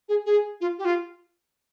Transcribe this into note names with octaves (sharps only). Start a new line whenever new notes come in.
G#4
G#4
F4
G4
F4